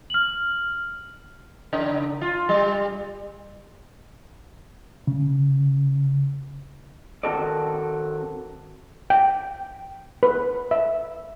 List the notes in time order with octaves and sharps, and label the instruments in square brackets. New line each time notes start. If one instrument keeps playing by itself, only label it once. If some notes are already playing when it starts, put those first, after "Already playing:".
[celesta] F6 F#7
[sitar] C#3
F4
G3
[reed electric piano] C#3
[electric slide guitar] D#3 C4 F#4 A4 A#4 D5
[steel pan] G5
B4
E5